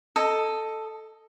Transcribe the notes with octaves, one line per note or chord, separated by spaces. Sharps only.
A4 D#5